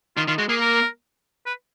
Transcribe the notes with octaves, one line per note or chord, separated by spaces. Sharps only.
D#3 F4
D#3 F4
G#3 F#4
A#3 G#4
A#4
B4